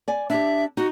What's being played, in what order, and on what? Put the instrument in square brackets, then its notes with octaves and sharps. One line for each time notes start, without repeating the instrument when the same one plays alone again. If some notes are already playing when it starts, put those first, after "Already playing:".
[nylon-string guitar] D5 G#5
[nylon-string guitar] D4 G4 [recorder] E5
[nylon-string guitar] D#4 [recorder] F#4